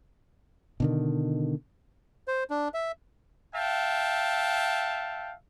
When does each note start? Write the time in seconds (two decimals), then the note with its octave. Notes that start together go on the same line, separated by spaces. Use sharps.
0.80 B2 D3 D#3
2.28 C5
2.50 D4
2.74 E5
3.56 E5 F5 G5 A5